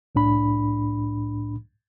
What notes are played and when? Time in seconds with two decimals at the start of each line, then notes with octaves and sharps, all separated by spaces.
0.15 C2 A2 D4 B5